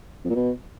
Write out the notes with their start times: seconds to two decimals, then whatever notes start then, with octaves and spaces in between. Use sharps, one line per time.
0.24 F2
0.30 A#2
0.35 B2